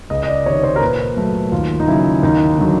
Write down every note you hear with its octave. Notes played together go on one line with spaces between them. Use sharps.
C#2 D#5
D#5
D5
C3 D#3 C#5
C5
A#4
A#2 B4
F#3 A3
D#2 F4
D#4
C#3 F#3 E4
D#2 D#4
D3 F#3